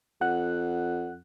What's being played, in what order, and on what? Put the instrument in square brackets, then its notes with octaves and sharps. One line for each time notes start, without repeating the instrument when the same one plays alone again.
[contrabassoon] F2 [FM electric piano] F#5 F#6